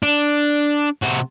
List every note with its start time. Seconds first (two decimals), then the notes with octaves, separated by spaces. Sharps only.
0.03 D4
1.02 C3 F#4